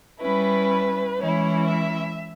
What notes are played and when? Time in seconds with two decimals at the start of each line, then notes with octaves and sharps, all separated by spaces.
0.21 G3 C#4 E4 B4
1.19 E3 G#3 C#4 E4 C#5
1.69 E5